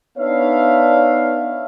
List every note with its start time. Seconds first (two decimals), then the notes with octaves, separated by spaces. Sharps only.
0.18 B3 D4 D#4 C#5 E5 F5